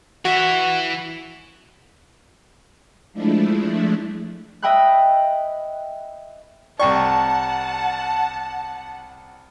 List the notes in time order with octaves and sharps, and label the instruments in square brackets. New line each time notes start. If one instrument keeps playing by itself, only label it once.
[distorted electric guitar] E3 E5 [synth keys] F#4
[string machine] F3 G#3 A3 D4 E4
[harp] D#5 E5 G5 B5 E6 F#6
[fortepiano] C2 C#6 [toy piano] D5 G5 [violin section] F#5 A5